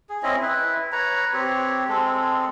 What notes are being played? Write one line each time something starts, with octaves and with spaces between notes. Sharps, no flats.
G#4
C4 C#4 E4 D#5
E4 B4
B4 C#5 A#5
C4 G4 C#5
G#3 C4 A4